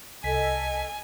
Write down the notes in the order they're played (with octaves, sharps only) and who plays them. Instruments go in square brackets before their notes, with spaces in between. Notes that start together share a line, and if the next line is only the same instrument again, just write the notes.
[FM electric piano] C2 B6 [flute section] A4 D#5 [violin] G#5